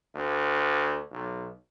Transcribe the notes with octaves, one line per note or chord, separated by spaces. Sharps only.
D2
B1